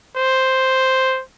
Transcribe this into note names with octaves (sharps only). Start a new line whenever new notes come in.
C5